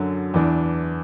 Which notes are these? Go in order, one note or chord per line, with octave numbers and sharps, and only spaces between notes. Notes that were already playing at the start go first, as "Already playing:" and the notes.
Already playing: F#2 D3 F#3
E2 E3 D4